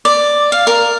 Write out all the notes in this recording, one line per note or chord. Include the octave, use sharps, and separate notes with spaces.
D5
F5
A#4